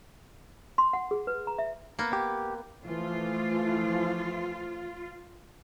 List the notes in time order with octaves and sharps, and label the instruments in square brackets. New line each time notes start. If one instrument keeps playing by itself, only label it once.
[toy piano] C6
F#5
G#4
B4
A#5
E5
[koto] A#3 B3
[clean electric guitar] G4
[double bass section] E3 F3 A3 [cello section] F4